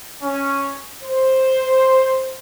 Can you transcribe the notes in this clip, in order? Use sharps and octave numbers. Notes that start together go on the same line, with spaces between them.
C#4
C5